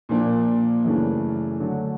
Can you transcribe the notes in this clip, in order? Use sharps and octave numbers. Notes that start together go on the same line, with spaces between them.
A#2 F3 A#3 D4
F#2 C#3 E3 A3 D4
D3 F#3 A3 D4